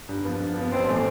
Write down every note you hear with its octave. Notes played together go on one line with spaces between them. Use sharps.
G2
F3 B3
G2
F3 B3
A1 C4
A2 E3 A3